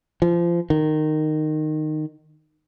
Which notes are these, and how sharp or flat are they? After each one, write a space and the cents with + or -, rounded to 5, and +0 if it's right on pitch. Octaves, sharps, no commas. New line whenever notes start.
F3 -25
D#3 -15